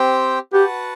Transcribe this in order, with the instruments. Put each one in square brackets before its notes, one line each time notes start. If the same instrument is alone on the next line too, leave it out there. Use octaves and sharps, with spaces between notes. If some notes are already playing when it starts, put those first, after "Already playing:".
Already playing: [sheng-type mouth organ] C4 G4 C5 G5
[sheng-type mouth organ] F#4 B4 F#5 A5 [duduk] G4